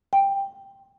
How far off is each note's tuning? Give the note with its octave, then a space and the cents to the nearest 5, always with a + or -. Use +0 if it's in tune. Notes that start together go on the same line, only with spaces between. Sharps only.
G5 +10